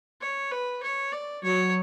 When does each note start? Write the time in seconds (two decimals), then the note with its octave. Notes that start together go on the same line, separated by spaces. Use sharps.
0.21 C#5
0.51 B4
0.83 C#5
1.12 D5
1.44 F#3 C#5